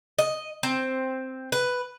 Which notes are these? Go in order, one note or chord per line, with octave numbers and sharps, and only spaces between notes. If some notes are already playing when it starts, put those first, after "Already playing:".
D#5
C4
B4